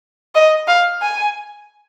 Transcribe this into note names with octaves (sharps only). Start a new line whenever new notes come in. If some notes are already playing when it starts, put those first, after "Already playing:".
D#5
F5
G#5